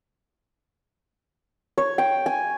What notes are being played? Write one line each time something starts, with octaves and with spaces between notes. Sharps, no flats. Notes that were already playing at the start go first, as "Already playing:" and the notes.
C#5
G5
G#5